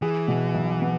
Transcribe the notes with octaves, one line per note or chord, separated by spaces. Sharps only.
E3 G#4
B2
B1
B3